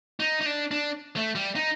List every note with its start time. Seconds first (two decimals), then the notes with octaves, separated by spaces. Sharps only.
0.20 D#4
0.41 D#4
0.46 D4
0.71 D4
1.17 A3
1.35 G3
1.55 D#4